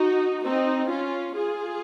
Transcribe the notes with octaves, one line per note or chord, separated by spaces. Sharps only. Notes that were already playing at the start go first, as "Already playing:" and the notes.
Already playing: D#4 F#4
C4 D#4
C#4 F4
F4 G#4